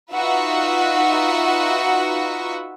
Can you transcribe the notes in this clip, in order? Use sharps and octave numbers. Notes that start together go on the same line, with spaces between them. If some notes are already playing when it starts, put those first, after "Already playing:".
D#4 F4 F#4 B4 E5 F#5